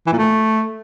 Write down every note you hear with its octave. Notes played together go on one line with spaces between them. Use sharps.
E3
A#2
A3